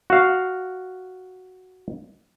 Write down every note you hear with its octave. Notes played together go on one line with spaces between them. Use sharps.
F#4 F5